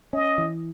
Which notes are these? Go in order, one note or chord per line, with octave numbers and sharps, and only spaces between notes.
C#4 D#5
E3